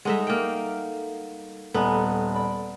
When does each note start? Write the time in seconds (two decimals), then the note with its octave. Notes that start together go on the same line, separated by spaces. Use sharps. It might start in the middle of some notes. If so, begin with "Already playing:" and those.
0.05 G3 G#3 D#4 A4 E5 F#5
0.27 A#3 G5
1.74 D#1 B3 A4 G#5
2.35 D5 B5